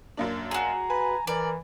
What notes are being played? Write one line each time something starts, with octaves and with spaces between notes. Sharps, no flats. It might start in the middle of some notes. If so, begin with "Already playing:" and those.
F#2 A#3 D4
F#4 G#4 A#5
B4 G#5
E3 A#4 D5